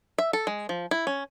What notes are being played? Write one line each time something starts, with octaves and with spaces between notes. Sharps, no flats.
E5
A4
G#3
F3
E4
C#4